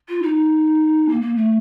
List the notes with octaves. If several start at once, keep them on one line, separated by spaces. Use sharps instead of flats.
F4
D#4
A#3
A#3
A3